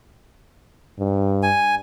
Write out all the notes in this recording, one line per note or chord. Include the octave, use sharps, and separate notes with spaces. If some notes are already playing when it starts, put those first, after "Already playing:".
G2
G#5